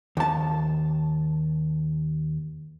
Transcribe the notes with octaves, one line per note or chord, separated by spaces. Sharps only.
D#2 A5